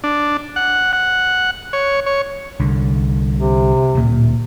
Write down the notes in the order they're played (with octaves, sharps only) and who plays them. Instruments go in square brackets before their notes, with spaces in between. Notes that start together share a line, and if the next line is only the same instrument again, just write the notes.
[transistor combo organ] D4
F#5
F#5
C#5
C#5
[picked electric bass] C2 D3
[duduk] C3
[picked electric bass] D1 A#2